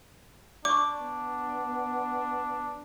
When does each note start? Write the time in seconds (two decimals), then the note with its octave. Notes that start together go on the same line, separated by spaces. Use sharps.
0.65 D4 D5 C#6 D6
1.00 B3